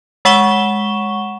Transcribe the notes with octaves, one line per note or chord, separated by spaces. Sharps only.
G#3 F#5 C#6 E7 G7